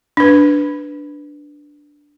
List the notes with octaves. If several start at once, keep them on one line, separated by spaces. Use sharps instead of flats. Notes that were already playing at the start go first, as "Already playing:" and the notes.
D4 B4